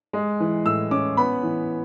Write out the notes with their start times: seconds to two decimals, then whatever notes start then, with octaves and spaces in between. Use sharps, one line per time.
0.13 G#3
0.40 E3
0.65 A2 E6
0.91 C#4 D6
1.17 B3 B5
1.43 E3